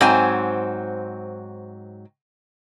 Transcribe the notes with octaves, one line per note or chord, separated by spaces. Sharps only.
G#2 F#3 C4 G#5